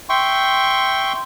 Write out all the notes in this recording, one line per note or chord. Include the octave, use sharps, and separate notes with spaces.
E5 G5 C6 C#6